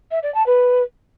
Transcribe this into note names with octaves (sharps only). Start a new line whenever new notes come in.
E5
D5
A5
B4